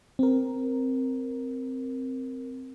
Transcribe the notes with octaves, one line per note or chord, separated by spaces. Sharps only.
C4 A#4